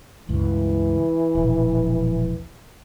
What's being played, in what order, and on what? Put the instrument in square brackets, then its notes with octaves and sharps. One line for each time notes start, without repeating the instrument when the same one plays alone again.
[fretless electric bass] C#2 G2 [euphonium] E3
[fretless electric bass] E1 A#1